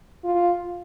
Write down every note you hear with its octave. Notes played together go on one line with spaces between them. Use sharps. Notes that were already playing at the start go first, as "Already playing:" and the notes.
F4